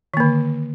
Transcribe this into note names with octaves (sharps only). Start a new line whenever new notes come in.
D3 D#3 A#3